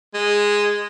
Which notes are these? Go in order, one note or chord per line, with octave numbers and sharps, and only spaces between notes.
G#3